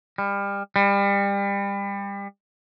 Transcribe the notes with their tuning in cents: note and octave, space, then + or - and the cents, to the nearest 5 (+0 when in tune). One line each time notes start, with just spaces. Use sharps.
G3 +30
G3 +30